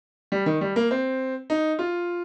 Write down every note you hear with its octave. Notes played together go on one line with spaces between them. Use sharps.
G3
D#3
G3
A#3
C4
D#4
F4